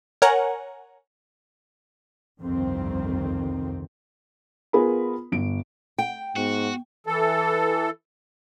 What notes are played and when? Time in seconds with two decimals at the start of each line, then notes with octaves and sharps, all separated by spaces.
0.22 A#4 C#5 F#5 G#5 A#5
2.40 G1 C2 F2 D#3 C4
4.73 B3 F4 G#4 A#4 B4 B5
5.32 G1 D7
5.98 G5
6.36 G#2 B3 F#4
7.07 E3 A4